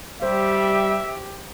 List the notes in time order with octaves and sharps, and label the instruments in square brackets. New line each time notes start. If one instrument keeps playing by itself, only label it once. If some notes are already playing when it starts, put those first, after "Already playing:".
[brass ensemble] G3 [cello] G4 [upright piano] C5 [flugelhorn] E5